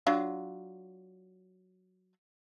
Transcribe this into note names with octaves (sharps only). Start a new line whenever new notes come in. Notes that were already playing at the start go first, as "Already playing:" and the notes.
F#3 D4 F4